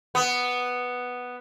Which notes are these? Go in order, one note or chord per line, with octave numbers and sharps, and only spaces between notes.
B3